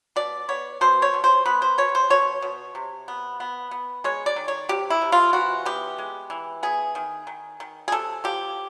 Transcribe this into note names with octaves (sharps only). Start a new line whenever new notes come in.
B2 D5
B3 C#5
B2 C5
C#5
B2
C5
B3 B4
C5
B2 C#5
C5
B2 C#5
B2
C3
B3
B3
B3
G#3 C#5
D5
D#3
C#5
C3 G4
E4
C3
F4
E3 F#4
B3 G4
G#3
E3
B3 G#4
D#3
D#3
D#3
G#4
C3 A4
F3 G4